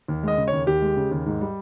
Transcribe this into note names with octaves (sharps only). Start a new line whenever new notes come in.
D#2
G#3 D#5
C#3
D#2 C#5
D#2 G4
G#3
C#3
D#2
G#2
G3